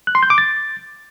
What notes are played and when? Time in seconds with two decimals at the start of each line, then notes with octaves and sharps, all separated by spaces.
0.07 F#6
0.15 C6
0.23 G6
0.30 D6
0.38 A6